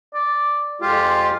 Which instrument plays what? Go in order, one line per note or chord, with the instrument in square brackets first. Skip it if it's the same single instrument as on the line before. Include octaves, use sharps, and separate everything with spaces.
[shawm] D5
[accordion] F2 G#3 G4 [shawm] F4